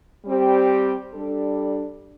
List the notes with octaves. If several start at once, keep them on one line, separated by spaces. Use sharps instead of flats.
G3 C4 G4
G3 D4 A4